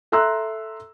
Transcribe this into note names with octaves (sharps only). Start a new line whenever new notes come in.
A4 E5 A#5 C6 E6 F#6